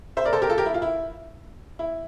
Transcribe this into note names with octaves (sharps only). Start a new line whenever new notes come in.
C5 E5
A#4 D5
A4 C5
G4 A#4
F4 A4
G4 A#4
E4
F4
E4
E4